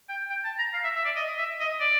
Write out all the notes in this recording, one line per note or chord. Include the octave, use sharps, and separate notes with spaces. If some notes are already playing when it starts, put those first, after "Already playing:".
G5
G5
A5
A#5
F5
E5
E5
D5
D#5
E5
D#5
D5